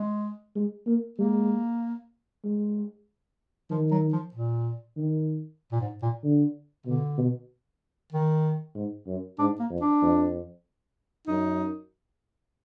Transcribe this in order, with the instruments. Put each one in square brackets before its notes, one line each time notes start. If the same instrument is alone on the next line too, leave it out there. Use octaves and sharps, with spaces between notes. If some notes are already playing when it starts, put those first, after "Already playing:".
Already playing: [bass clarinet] G#3
[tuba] G#3
A#3
[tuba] G#3 [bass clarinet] A#3
[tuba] G#3
[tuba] D#3 [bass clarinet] F3
[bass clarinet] F#3
F3
A#2
[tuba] D#3
[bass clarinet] A#2
G#2
A#2
[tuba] D3
[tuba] B2 [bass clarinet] D3
[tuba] B2
[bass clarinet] D#3
[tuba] G#2
F#2
[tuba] G#2 [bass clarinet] D4
[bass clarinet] A#3
[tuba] F2
[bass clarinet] D4
[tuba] F2
[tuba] F#2 [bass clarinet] D#4